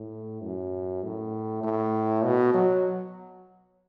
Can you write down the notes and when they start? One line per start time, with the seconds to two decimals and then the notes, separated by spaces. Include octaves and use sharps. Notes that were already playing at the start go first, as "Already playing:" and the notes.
Already playing: A2
0.42 F#2
1.04 A2
1.64 A2
2.25 B2
2.54 F#3